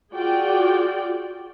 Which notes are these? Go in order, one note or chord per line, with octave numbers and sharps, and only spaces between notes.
F4 F#4 G#4 D5 G5